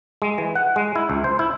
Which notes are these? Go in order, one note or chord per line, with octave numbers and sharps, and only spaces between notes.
G#3
E3
F#5
G#3
E4
C#2
C5
E4